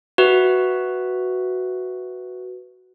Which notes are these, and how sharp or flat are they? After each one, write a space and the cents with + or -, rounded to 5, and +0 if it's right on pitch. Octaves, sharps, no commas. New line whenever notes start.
F#4 +0 B4 +0 E5 -5